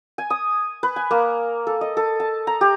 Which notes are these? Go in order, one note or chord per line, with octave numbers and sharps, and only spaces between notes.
G#5
D#6
B4
G#5
A#3
A4
D#5
A4
A5
A#5
G4